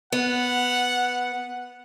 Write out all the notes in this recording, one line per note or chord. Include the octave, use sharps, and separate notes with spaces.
B3 F#5